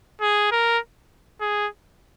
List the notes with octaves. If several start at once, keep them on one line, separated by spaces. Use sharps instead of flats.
G#4
A#4
G#4